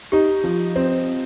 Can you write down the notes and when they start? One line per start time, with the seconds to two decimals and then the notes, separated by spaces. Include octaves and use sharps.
0.12 D#4 G4
0.44 F3
0.76 C4